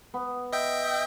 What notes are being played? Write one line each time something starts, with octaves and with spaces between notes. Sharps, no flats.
B3
D#5 E5 G5